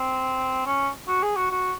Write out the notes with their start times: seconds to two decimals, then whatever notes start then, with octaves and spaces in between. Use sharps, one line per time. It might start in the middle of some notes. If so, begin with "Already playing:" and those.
Already playing: C4
0.66 C#4
1.08 F#4
1.22 G#4
1.36 F#4
1.51 F#4